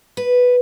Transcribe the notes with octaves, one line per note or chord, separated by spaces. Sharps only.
B4